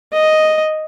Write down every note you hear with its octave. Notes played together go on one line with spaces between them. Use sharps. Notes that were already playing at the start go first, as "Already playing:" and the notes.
D#5